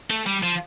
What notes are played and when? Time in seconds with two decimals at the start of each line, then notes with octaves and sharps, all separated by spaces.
0.10 A3
0.26 G3
0.43 F3